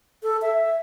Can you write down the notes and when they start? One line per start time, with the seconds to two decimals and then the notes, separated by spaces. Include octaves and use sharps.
0.23 A4
0.42 E5